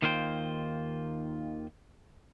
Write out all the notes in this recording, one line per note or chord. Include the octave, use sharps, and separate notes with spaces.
D#2 D#3 A#3 F4 C5 G5